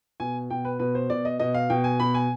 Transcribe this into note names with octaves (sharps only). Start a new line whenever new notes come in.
B2 G#5
B2 G5
B4
B2 B4
C5
B2 D5
D#5
B2 D#5
F5
B2 G5
G#5
B2 B5
G#5